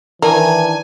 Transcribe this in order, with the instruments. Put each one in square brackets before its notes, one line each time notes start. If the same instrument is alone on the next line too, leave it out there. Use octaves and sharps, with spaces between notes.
[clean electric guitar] D#3 D4 [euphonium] E3 [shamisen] A#4 [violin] G#5